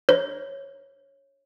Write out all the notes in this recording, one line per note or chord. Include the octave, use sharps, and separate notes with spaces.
C#5